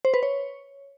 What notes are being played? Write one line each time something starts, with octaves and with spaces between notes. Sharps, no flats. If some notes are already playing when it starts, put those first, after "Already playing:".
C5
B4
C#5